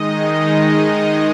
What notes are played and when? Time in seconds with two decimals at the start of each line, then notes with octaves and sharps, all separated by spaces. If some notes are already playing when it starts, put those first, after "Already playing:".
Already playing: D#3 G#3 D#4 D#5
0.16 D#5